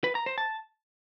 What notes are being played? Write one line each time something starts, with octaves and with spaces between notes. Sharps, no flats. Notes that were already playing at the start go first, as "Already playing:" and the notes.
B4
A#5
C5
A5